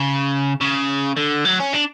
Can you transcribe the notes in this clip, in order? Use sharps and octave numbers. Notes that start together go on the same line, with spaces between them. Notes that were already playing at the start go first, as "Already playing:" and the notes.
Already playing: C#3
C#3
D3
F#3
C#4
D4